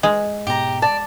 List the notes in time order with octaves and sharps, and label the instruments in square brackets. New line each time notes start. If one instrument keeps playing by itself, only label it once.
[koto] G#3
[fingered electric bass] G#2 B2 [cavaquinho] G4 A#5
[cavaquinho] D5 [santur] A5